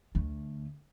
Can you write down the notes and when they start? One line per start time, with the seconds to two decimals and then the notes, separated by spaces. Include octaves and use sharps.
0.15 D2 A3